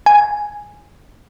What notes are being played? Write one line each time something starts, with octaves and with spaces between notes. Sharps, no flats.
G#5